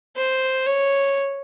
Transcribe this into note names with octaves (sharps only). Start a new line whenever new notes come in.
C5
C#5